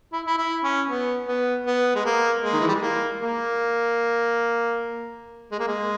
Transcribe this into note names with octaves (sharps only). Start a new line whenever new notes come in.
E4
E4
E4
C#4
B3
B3
B3
G#3
A#3
G#3
D#3
E3
G3
G#3
A#3
A#3
G#3
A#3
G#3